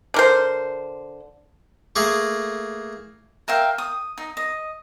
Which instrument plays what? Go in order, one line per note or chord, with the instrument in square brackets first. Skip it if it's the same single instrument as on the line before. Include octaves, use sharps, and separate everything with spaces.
[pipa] D3 A#4 C5
[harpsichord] A3 A#3 G#4
[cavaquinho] A#4 E5 F5 G5
D#6
D#4
D#5